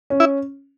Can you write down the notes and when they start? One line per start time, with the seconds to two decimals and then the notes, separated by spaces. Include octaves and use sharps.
0.10 C#4
0.20 E4